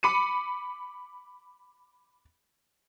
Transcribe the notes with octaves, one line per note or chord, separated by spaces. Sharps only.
B5 D6 C#7 D#7